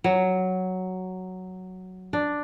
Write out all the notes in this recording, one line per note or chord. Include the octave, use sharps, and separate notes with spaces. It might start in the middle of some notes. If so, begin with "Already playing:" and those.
F#3
D4